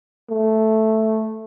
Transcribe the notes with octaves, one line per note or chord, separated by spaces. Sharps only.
A3